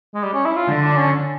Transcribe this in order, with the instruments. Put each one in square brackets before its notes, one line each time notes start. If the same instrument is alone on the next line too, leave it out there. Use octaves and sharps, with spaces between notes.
[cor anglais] G#3
G3
C#4
E4
F4
[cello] D3
[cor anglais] D4
C#4